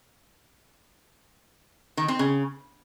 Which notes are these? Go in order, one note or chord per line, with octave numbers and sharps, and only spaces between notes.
D#3
C4
C#3